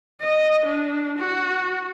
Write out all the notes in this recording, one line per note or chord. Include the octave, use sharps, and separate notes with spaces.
D#5
D4
F#4